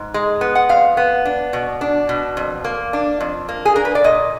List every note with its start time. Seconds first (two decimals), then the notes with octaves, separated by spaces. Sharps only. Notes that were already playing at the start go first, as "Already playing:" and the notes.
Already playing: G#2
0.14 G#3
0.41 B3
0.55 F#5
0.69 F2 F5
0.97 B3
1.25 D4
1.53 B2
1.81 D4
2.09 B2
2.37 F2
2.64 A#3
2.93 D4
3.21 F2
3.49 A#3
3.65 G#4
3.76 D4 A#4
3.85 B4
3.95 D5
4.04 A#2 D#5